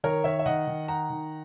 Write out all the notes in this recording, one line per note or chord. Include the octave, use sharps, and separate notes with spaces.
D#3 A#4 C#5
D#3 C#5 E5
E5
D#3 D#5 F#5
D#3
D#4 F#5 A#5
D#3